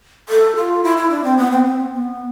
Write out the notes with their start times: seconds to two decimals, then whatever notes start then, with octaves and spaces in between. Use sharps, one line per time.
0.29 A4
0.56 F4
0.84 E4
0.97 E4
1.10 D4
1.24 C4
1.37 B3
1.51 C4
1.65 C4
1.79 B3
1.92 B3